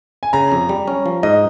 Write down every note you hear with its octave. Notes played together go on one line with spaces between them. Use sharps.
G#5
C#3 A#5
F2
G3
C#4
F3
G#2 D#5